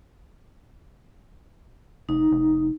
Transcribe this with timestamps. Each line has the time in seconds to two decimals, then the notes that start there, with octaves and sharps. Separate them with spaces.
2.09 F1 D#4
2.32 F1